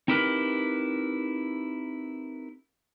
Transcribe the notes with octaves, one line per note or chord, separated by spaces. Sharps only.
C4 D#4 E4 G4 A#4 B4